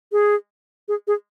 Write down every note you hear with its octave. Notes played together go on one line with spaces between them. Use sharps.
G#4
G#4
G#4